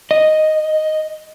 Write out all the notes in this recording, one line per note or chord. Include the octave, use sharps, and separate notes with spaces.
D#5